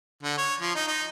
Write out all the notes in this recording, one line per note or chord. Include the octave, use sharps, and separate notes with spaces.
D3
C#5
F3
D#4
D#4